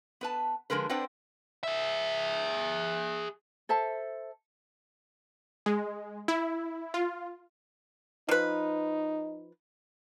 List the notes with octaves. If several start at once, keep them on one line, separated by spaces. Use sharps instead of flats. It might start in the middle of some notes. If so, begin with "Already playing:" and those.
B3 B4 A5
D3 F3 G#3 A#4 B4
C4 D4 B4 C5 D5 F#5
G#4 E5
A4 C5 E5 A5
G#3
E4
F4
F3 D#4 B4